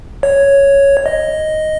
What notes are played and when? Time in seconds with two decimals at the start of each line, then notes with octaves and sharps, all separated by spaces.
0.23 C#5
1.06 D#5